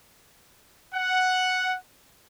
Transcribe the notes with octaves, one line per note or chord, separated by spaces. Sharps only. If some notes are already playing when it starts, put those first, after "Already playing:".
F#5